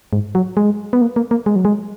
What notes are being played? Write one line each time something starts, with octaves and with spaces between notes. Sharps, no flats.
G#2
F#3
G#3
B3
A#3
A#3
A#3
G#3
F#3
G#3